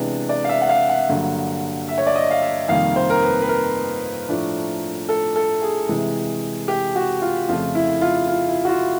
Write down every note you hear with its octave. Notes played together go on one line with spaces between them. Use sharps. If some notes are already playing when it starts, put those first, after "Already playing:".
Already playing: C3 E3 G#3 B3 D4
D5
F5
E5
F#5
F5
F#5
G2 D3 F#3 A#3
E5
C#5
D5
D#5
F5
E5
F2 C3 D#3 G3 A#3 F5
C5
A#4
B4
B4
A#4
A2 F3 A3 D4
A4
A4
G#4
C3 E3 G#3
G4
F#4
F4
F2 C#3 F3 A3 F4
E4
F4
F4
E4
F#4
F4